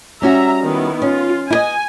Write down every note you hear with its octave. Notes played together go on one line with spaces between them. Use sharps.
G3 C#4 F#4 E5 A#5
D#3 B3 E4
C#4 F4
E4 B4 D#5 G#5